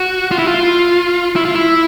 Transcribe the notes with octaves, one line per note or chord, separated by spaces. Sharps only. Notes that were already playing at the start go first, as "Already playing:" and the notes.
Already playing: F#4
F4
E4
F4
E4
F4
E4